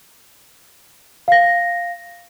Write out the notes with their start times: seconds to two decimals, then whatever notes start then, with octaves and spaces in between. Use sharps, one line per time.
1.28 F5 A#6